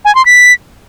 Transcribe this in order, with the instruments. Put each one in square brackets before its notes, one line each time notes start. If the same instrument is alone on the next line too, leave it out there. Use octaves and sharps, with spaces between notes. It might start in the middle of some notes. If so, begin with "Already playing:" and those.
[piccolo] G#5
C6
B6